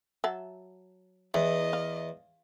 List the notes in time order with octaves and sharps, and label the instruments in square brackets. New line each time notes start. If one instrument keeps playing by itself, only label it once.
[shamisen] F#3 E5 A5
[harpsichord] E2 [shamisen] E3 [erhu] D#5
[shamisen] F5